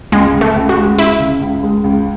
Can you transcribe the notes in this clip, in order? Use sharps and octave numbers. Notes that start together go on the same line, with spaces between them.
C#2 G#3
C#3
A3
C#2
F#4
G#3
C#2 E4
C#3
C#2
G#3
C#2